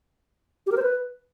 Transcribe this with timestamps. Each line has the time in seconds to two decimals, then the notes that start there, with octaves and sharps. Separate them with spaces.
0.67 G4
0.72 A#4
0.77 C5
0.82 B4